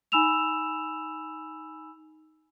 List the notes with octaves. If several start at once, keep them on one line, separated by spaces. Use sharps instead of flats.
D#4 G#5 B5 E6 E7 F7